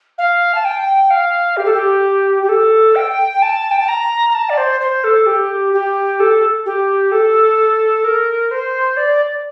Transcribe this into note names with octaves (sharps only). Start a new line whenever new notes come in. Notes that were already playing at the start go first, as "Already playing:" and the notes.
F5
A5
G5
F5
G4
A4
G4
G4
A4
G5
A5
G5
A5
A#5
A#5
A5
D5
C5
C5
A4
G4
G4
A4
G4
A4
A#4
C5
D5